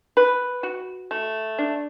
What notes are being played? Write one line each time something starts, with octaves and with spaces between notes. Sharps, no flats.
B4
F#4
A3
D4